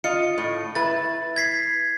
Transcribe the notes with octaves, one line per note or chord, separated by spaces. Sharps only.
F4 D#5 C#7
A2
E4 B4 A6
G#6 B6 C7